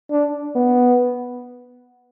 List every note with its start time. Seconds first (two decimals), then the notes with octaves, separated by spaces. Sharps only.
0.11 D4
0.55 B3